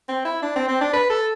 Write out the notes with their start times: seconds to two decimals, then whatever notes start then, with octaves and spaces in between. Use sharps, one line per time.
0.08 C4
0.25 E4
0.42 D4
0.56 C4
0.68 C4
0.81 D4
0.93 B4
1.09 A4